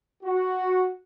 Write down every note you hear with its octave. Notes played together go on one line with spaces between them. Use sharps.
F#4